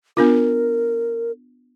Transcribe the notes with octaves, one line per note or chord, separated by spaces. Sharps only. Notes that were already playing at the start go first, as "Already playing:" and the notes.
B3 D4 F4 A#4